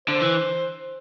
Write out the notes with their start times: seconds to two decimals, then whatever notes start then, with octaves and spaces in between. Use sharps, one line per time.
0.08 D3 C5
0.22 E3